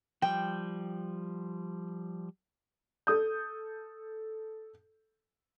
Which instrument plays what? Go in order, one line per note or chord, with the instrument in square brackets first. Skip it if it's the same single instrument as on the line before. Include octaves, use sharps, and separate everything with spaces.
[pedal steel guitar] F3 G3 [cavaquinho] G5
[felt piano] A4 D#6 G6